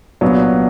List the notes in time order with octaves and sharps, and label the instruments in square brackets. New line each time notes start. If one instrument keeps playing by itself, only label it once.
[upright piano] C2 A#2 F#3 B3 D4